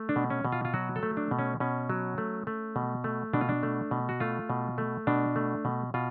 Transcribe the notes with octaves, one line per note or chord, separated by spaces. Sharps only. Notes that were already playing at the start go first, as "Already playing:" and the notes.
Already playing: A3
D4
B2
C#4
B2
F4
F4
F#3 F#4
A4
A3
D4
B2
C#4
B2 C#4
F#3
A3
A3
B2
A3
B2 D4
F4
D4
A3
B2
F#4
A3 F4
B2
A3
B2 D4
A3
B2
B2 F4